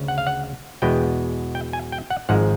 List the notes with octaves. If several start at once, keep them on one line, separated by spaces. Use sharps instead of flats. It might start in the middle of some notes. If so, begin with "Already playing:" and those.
Already playing: D2 C#3
F#5
F5
F#5
E2 B2 G#3 B3 G5
G5
G#5
G5
F#5
G#1 G#2 F3 G#3 F#5